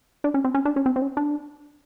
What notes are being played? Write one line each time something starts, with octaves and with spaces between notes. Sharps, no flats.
D4
C#4
C4
C#4
D4
C#4
C4
C4
C#4
D4